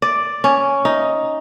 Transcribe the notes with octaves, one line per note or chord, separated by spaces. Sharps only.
D5
C#4
D#4